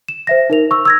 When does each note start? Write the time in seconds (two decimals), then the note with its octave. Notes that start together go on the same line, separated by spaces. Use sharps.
0.08 E7
0.27 C5 E5 A#6
0.50 D#4 A#4 F7
0.71 C#6 E6
0.85 E6 G#6 A#6